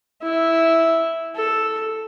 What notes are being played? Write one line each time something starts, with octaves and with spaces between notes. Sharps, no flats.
E4
A4